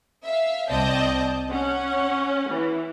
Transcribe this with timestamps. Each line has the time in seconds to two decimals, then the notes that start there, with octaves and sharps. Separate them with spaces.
0.23 E5 F5
0.68 C2 C4 D5 D#5 A5 G6
1.49 C#4 F#5
2.50 E3